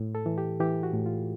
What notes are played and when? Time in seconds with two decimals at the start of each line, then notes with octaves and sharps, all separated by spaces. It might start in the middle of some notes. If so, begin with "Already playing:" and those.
Already playing: A2
0.15 A4
0.26 E3
0.38 G4
0.60 E3 G4
0.83 F#4
0.94 A2
1.06 F4